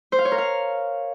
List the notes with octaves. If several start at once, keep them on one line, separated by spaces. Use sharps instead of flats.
C5
F5
C#5
A#4
F5